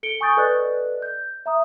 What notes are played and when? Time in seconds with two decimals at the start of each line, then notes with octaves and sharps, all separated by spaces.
0.03 A4 C#7 D7 G7
0.21 G#5 C#6 D#6 G6 A6
0.37 A4 B4 D5 D#5 F#6
1.02 G6
1.46 E5 A#5 D#6